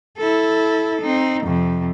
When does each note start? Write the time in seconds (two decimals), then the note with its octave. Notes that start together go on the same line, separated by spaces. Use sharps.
0.17 E4 A4
1.01 C4 D#4
1.44 F2 C3